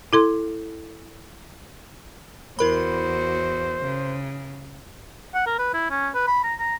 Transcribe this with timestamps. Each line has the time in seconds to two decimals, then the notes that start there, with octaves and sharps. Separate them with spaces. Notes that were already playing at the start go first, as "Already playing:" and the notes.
0.13 E4 A4 C6
2.59 E2 E4 F#4 A#4 C5 B5
3.83 C#3
5.34 F#5
5.46 A#4
5.59 B4
5.74 E4
5.90 C#4
6.14 B4
6.27 B5
6.44 A#5
6.59 A#5